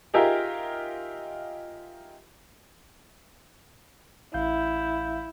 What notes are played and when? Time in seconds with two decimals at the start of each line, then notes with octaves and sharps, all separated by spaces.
0.14 D#4 F4 G4 G#4 A#4 E5
4.34 A1 E4 F5 G6